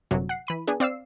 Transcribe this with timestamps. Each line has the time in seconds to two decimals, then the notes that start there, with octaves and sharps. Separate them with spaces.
0.11 G1 F#2 C3 F#3
0.29 F#5 C7
0.47 E3 B5 D#7
0.68 B3 D4 G#4
0.80 C4 D5 F5 E6 C7